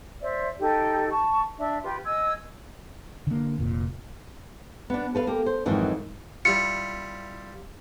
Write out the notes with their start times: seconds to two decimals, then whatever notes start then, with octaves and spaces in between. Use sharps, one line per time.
0.22 C5 D5 E5
0.59 D#4 G4 A4
1.10 A5 C#6
1.58 D4 E5
1.82 F4 G4 B4 C6
2.04 D#5 G#5 E6 G#6
3.27 D3 A#3
3.59 F1 A#2
4.90 B3 D4
5.15 A4 B4 F5
5.27 A#3 G4
5.46 C5
5.65 F2 G#2 D#3 E3 F#3
6.45 G3 E4 F4 C#7